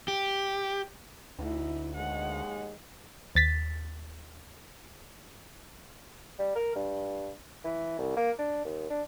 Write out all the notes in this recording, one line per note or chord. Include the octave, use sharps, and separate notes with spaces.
G4
D2 D#4 E4
D#2 G#3 F#5
D#2 A6 B6
G3
A#4
G2
E3
C2
A#3
D4
D#2
D4